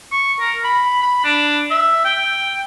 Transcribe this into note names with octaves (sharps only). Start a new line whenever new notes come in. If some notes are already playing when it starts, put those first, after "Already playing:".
C#6
A#4
B5
B5
D4
E5
G5